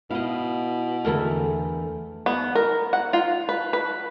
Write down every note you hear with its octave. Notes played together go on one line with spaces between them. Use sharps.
B2 E4 D#5 F5
E2 D3 E3 A3 E4 A4 A#4
B3
A#4
F#5
F4
B4
B4